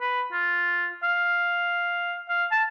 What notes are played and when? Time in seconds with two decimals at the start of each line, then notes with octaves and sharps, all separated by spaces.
0.01 B4
0.33 F4
1.03 F5
2.29 F5
2.51 A5